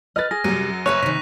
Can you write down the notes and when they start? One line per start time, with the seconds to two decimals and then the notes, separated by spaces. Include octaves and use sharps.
0.16 B4 D#5 F6 A6
0.31 G#4 A#6
0.44 F#2 C3 F#3 G3 D#7
0.86 F#1 B4 C#5 E5 A5 C#6 F#6 F7
1.02 C3 D#3 B6